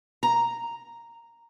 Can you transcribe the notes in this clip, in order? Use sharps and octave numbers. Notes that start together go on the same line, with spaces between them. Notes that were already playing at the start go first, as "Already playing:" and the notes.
A#5